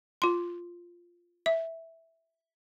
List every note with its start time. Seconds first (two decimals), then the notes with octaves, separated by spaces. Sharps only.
0.22 F4 C6
1.46 E5